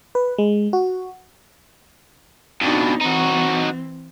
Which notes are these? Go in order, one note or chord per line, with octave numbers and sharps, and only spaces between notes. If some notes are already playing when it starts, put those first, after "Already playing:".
B4
G#3
F#4
F2 B2 D4 D#4
E3 C4 D#4 F#4